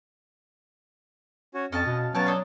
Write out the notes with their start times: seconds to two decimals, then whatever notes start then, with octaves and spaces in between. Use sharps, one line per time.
1.54 C#4 F#4 C#5
1.72 F2 C#4 D#5 F5 A5
1.86 B2
2.15 F#3 B3 C#4 C#5 F5 G5 A5
2.27 D4 D#4 A4